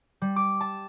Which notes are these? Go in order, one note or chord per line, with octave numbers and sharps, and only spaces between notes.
G3
D6
A5